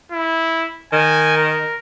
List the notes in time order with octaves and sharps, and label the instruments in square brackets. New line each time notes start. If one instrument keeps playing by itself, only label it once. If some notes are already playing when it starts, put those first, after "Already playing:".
[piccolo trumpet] E4
[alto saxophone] D#3 [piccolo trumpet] G#5
[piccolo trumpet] A#4